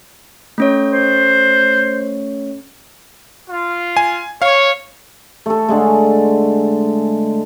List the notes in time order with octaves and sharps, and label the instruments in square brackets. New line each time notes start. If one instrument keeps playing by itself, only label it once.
[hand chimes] A3 C#4 C#5
[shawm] C5
[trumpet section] F4
[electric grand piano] G#5
[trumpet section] C#5 [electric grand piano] F5
[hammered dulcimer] A3 A4
D3 G#3 A3